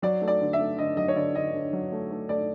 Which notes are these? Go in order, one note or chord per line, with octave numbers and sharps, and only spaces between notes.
F#3 D5
A3
D5
D3
E5
A3
D3 D#5
F#3 D#5
C#5
D3 D5
D3 D#5
D3
F#3
A3
A3
A3 D5